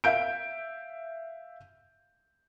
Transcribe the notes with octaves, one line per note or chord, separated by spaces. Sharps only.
E5 F5 G6 D7